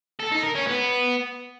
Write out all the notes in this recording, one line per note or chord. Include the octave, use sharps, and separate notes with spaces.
A4
D#4
A#4
C#4
B3